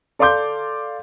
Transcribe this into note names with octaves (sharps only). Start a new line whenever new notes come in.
A4 D5 F5 C6 D6 G6